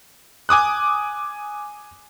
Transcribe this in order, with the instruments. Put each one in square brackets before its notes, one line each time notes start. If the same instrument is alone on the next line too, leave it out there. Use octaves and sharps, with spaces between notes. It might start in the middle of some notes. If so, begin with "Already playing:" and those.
[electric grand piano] G#5 D6 D#6 F#6